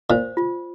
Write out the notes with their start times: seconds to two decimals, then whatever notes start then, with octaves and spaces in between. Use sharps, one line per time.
0.10 A#2 C5
0.37 F4